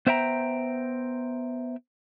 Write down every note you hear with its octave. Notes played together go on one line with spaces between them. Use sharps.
B3 C5 E5 G5 A#5